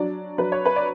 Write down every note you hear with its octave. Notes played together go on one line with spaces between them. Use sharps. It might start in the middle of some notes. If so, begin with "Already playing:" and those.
Already playing: F#3 D4 D5
F#3 B4
C#5
B4
D5